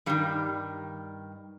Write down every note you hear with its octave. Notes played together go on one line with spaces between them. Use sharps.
G2 D#3 G3